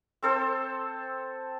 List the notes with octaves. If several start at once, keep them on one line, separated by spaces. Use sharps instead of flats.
C4 A4 C5 E6